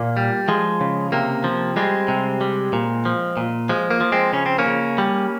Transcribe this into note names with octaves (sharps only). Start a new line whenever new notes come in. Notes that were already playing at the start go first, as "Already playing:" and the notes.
Already playing: A#2 A#3
G3
F3 G#3
C#3
C3 A#3
F3
G3 G#3 C4
C3
G3
A#2
F3
A#2
F3 G#3
A#3
F3
G#3 C4
C#3 C#4
C4
A#3 C#4
C#3
G3